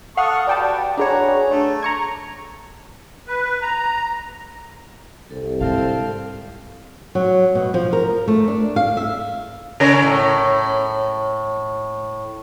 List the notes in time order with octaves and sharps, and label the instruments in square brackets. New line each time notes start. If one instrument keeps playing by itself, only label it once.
[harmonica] A4 C#6 D#6 [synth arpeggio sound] F5 F#5 F6
[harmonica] F#4 G4 B4 [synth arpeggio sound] D5 G5 A5
[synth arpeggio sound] D4 G#4 C#5 [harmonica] F#4 B4 A#5
[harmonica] A3
[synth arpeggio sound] A#5 C#6 G#6
[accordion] B4
A#5
[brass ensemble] C2 [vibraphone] G4 A4
[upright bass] G#2 D3 [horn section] C4 F5 A5
[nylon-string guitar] F#3
B2
F3
A#4
A3
D4
F5
E5
[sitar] C#3 C#4 A#4
A2